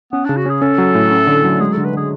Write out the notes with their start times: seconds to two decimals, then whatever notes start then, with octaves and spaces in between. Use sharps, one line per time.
0.12 B3 C#4
0.25 C#3 D4
0.37 F#4
0.46 C#4 G#4
0.61 C#4 A4
0.78 F#3
0.95 A2
1.11 C#4
1.27 D3
1.44 F#3
1.60 G#3 G#4
1.72 D3 A4
1.85 B4
1.93 D3 G#4